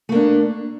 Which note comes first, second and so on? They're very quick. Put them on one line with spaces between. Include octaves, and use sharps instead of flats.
A3 A#3 D4